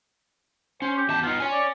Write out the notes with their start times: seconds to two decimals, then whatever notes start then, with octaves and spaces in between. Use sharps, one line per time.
0.82 C#4 C5
0.97 G4
1.09 E2 G4 A5
1.23 B3 D#4 F4
1.40 C#5 G#5
1.52 D5